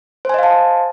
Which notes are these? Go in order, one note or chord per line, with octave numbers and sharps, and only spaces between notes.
C5 D#5 F5 G#5 A5